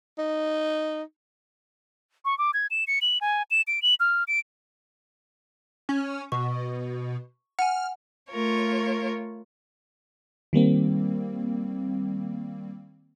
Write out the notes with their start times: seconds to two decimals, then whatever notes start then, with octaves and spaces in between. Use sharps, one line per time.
0.18 D#4
2.25 C#6
2.38 D6
2.54 G#6
2.71 E7
2.87 C#7
3.02 F#7
3.21 G#5
3.51 E7
3.68 D7
3.82 F#7
4.00 F6
4.28 D7
5.89 C#4
6.32 B2 C#6
7.59 F#5 G#5 F6
8.30 A3 F4 A#4 C#5
10.53 D#3 G3 A#3 C4